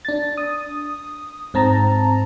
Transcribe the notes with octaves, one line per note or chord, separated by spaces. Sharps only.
D4 A6
D#6
G#2 C4 A5 A#5